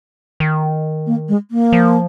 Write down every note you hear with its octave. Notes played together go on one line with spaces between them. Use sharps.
D#3
A#3
G#3
A#3
F3